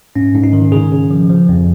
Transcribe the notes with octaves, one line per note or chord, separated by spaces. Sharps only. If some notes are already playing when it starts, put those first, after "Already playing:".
G#2 C#4
G#2
D#4
D#3
C#3 G#4
C#3
F3
F3
F2